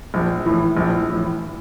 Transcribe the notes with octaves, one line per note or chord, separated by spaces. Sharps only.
A#1
A2 E3
A#1
A2 E3